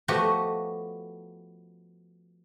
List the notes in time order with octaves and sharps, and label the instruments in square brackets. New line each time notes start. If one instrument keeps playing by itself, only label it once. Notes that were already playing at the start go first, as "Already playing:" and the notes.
[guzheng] F3 A3 B3 F#4 G4 D#5